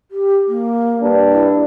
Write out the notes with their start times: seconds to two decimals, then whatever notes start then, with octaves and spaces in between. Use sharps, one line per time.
0.11 G4
0.48 A#3
1.01 G2 D4
1.32 E4